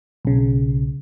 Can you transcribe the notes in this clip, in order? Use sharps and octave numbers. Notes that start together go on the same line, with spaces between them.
B1 C#3